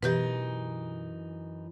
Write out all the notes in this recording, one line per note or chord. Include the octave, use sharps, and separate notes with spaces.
F#2 B2 E3 D#4 G4 B4